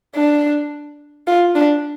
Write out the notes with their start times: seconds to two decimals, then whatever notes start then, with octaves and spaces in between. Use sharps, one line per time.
0.15 D4
1.27 F4
1.55 D4